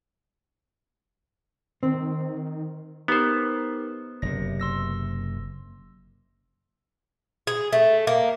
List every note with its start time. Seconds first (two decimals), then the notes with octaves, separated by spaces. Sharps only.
1.83 D#3 C4
3.08 B3 D#4 G4 A#4 C5
4.22 F#1 C3 A#6
4.60 C6 E6 A#6
7.47 G#4
7.73 A3
8.07 A#3